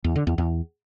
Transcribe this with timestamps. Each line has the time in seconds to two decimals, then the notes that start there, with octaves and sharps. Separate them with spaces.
0.04 E2
0.16 D3
0.27 E2
0.38 E2